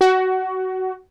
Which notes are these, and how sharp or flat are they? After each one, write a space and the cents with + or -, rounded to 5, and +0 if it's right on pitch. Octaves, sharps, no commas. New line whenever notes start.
F#4 +15